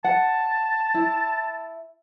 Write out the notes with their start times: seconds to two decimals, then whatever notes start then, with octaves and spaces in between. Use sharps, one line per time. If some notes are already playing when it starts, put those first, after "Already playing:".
0.04 F#5 A5
0.94 E4